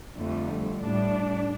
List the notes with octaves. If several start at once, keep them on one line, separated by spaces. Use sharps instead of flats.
F2 D3 G3 A3
A2 G3 D4